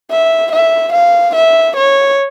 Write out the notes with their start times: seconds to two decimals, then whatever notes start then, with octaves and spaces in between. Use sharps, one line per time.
0.10 E5
0.52 E5
0.93 F5
1.35 E5
1.76 C#5